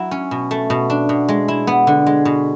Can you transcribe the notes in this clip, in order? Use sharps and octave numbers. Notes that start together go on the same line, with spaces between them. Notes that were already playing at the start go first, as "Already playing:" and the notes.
Already playing: F#3 E4
C#4
B2
A3
B2
D4
B2
G#3
E4
B3
D3
G#3
B2